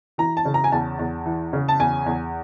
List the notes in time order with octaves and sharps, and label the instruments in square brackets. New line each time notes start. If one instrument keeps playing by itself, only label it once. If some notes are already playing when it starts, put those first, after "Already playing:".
[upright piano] E3 A#5
A5
C#3
A#5
G#5
E2 A5
E2
E3
C#3
A5
E2 G#5
E2